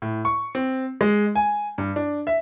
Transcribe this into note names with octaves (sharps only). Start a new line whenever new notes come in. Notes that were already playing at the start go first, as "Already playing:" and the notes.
A2
C#6
C4
G#3
G#5
G2
D4
E5